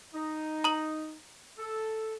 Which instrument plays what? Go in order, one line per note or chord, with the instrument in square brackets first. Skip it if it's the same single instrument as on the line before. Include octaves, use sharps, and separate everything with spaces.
[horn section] D#4
[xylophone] A#5 D#6 F#7
[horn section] A4